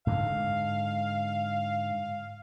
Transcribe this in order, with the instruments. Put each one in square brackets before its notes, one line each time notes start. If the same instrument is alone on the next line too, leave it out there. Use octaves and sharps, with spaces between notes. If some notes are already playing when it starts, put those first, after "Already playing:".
[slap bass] G#2 D3 G#3 [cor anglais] F5